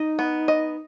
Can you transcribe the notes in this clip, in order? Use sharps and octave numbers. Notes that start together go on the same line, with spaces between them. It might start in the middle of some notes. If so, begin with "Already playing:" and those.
Already playing: D#4 D#5
B3
D#5